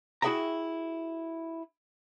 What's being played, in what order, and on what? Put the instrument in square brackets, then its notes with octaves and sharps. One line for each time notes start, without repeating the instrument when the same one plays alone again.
[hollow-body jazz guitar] E4 F#4 G#4 E5 G5 A#5